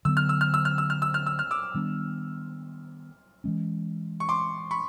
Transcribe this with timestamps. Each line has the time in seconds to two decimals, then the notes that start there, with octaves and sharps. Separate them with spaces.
0.05 D3 F#3 B3 E6
0.17 F6
0.29 E6
0.41 F6
0.54 E6
0.65 F6
0.78 E6
0.90 F6
1.02 E6
1.14 F6
1.26 E6
1.39 F6
1.51 D6 E6
1.74 D#3 G3 B3 D4
3.44 E3 G#3 C#4
4.20 C#6
4.29 C6 D6
4.71 B5 C#6